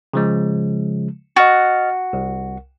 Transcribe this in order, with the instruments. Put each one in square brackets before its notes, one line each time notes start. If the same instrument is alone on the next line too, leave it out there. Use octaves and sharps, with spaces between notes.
[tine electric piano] C#3 F3 G#3
[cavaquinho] F#4 [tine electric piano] D#5 F6 A6
[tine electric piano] C2